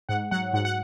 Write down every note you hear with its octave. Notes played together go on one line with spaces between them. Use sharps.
G#2 F#5
F#3 F#5
G#2 F#5
F#5